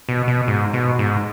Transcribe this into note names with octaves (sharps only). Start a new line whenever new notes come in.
B2
B2
G#2
B2
G#2